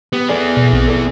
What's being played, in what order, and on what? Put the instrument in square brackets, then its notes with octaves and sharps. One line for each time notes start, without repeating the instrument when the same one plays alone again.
[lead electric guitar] B3 [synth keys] G4
[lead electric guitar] B3 G#4 [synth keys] A4 D5
[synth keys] B2
A#1 C4
A4 D5